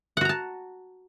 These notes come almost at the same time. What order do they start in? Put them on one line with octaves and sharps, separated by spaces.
F#5 F#4 A#5 A5